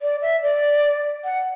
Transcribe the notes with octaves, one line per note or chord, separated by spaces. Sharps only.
D5
E5
D5
F#5